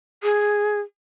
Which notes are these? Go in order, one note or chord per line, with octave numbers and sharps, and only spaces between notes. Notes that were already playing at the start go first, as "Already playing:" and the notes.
G#4